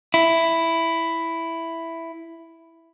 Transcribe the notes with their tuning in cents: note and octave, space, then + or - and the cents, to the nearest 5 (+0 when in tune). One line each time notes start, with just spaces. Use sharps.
E4 +5